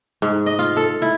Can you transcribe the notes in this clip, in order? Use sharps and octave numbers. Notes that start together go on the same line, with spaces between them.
G#2
D#5
F4
A4
E4